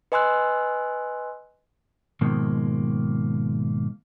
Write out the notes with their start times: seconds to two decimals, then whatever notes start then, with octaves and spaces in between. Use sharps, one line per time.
0.12 B4 D#5 G#5 C6 E6 F#6
2.21 G#2 B2 D#3 F3 G#3 A#3